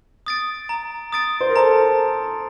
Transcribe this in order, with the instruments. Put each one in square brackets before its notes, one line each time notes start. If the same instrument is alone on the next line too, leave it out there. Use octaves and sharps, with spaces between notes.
[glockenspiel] D#6 A6 D7
A#5
D#6 A6 D7
[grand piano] C5
A#4
[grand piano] A4 [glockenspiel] A#5